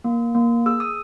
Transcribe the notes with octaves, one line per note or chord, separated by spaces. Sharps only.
A#3
A#3
G#4 E6
D#6